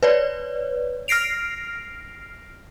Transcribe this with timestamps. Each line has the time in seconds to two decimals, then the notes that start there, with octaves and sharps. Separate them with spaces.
0.03 B4 C#5 D5
1.08 F6 A#6 C7 D7 F7